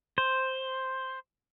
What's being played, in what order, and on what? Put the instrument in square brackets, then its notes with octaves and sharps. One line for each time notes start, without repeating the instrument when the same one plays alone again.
[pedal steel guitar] C5